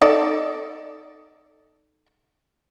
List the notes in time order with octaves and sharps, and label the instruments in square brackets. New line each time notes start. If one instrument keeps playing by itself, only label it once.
[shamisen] D#4 A4 D5